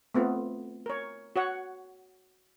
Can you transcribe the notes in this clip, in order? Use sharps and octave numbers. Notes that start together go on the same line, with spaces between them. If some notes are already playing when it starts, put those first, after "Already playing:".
A3 B3 C4 F4
A#4 C#5
F#4 C#5 F#5